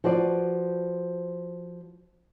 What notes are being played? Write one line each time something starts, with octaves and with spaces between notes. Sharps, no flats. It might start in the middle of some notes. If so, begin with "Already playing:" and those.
F3 F#4 B4 C5 D5